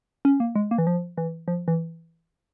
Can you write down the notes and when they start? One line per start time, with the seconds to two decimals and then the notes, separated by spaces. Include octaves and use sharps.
0.25 C#4
0.40 A#3
0.55 G#3
0.71 A#3
0.78 E3
0.87 F3
1.17 E3
1.48 F3
1.68 E3